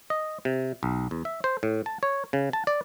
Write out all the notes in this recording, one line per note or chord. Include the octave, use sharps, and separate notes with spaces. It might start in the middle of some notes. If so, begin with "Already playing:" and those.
D#5
C3
B1
E2
E5
C5
A2
A5
C#5
C#3
A5
D5